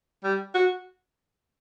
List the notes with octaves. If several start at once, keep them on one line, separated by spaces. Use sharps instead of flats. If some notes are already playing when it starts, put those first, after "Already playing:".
G3
F#4